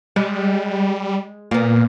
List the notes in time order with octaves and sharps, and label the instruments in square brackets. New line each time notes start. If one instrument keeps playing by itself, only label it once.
[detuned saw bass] G3 [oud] G#3
[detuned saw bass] A#2 [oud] A#3 B3